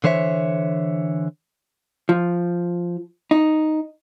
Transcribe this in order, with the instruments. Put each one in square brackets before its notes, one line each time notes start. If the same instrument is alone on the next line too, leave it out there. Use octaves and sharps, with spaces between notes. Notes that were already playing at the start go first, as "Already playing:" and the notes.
[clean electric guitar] D3 E3 C5 C#5 E5
[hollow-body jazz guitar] F3
D#4